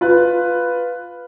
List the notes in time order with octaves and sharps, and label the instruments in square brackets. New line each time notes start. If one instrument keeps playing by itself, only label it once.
[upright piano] F4 B4